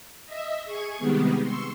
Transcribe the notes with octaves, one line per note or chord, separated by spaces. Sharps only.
D#5 E5
G#4 C#6 G#6
C3 D#3 G3 G#3 B3
C6 C#6 E6